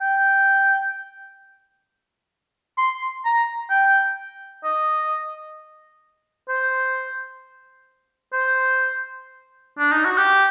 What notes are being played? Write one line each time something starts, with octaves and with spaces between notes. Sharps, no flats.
G5
C6
A#5
G5
D#5
C5
C5
D4
D#4
F#4
G4